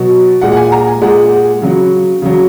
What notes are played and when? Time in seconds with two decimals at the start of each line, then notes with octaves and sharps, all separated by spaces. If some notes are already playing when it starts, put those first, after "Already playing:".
Already playing: B2 F#3
0.41 A#2 G#3 F#5
0.52 F#5
0.57 G#5
0.72 A#5
0.87 G#5
1.01 A#2 G#3 F#5
1.62 C#3 F#3
2.22 C#3 F#3